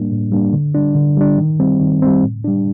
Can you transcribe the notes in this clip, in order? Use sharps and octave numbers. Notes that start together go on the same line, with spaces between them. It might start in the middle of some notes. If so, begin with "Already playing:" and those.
Already playing: A2 G3 A#3 D4
A2
G3 A#3 D4
D3
G3 D4
D3
G3 D4
D#3
G3 C4
D#3
G3 C4
A2
G3 D4